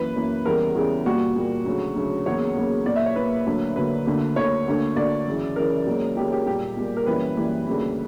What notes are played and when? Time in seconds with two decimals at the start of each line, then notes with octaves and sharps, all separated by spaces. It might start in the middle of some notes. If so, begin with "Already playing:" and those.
Already playing: F#2 E3 A#3 B4
0.15 F#2 E3 A#3
0.45 E2 C#3 E3 G3 A#4
0.75 E2 C#3 E3 G3
1.06 A#2 G3 A#3 F#4
1.36 A#2 G3 A#3
1.66 D2 C#3 F#3
1.95 D2 C#3 F#3
2.26 E2 C#3 F#3 A#3 C#5
2.56 E2 C#3 F#3 A#3
2.86 A#2 A#3 D5
2.96 E5
3.06 C#5
3.16 A#2 A#3 B4
3.46 D2 D3 F#3 A#3
3.76 D2 D3 F#3 A#3 B4
4.06 D2 D3 A#3
4.36 D2 D3 A#3 C#5
4.67 D2 D3 A#3
4.96 D2 D3 A#3 D5
5.27 F#2 C#3 E3
5.56 F#2 C#3 E3 A#4
5.87 C#2 C#3 F#3 A#3
6.17 C#2 C#3 F#3 A#3 G4
6.32 G4
6.46 A#2 G3 A#3 G4
6.77 A#2 G3 A#3
6.97 A#4
7.06 F#2 E3 G3 A#3 B4
7.36 F#2 E3 G3 A#3
7.67 D2 C#3 G3 A#3